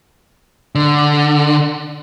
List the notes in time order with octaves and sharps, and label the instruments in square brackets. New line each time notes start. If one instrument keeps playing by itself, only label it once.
[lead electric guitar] D3